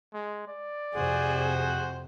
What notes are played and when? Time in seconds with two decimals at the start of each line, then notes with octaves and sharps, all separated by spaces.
0.14 G#3
0.48 D5
0.95 F2 C3 F#4 G#4 C5 F#5